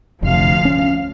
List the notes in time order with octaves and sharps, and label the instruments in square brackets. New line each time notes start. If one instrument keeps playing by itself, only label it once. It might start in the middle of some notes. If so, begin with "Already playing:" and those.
[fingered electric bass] F1 C3 [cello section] D2 F3 F5
[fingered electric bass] C#4